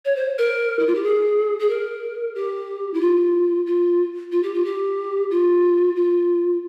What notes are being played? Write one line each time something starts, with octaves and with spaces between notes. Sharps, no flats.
C#5
C5
A#4
E4
F4
G4
G#4
G#4
A#4
G4
E4
F4
F4
F4
G4
F4
G4
F4
F4